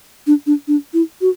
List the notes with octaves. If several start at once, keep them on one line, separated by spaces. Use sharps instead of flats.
D4
D4
D4
E4
F#4